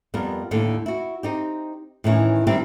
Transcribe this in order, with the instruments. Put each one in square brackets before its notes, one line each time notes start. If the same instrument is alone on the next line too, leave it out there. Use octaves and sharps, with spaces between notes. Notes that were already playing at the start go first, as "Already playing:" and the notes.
[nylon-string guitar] F2 G3 B3 A#4
D#2 A2 D3
E4 F#4
C4 D#4 G4
A2 D#3 E3 C#4
D#3 G3 C4 D4 E4 G4